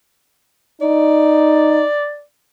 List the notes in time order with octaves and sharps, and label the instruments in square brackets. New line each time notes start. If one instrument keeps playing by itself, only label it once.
[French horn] D#4 [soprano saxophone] D5